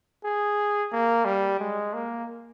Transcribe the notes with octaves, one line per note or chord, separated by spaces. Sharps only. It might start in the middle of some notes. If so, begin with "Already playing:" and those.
G#4
A#3
G3
G#3
A#3